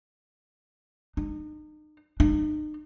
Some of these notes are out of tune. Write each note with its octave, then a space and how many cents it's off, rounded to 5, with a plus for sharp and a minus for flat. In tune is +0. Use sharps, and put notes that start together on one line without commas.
D#4 -35
D#4 -40